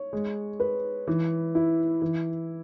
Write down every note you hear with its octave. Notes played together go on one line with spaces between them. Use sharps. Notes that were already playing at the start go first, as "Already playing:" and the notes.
Already playing: C#5
G#3
B4
E3
E4
E3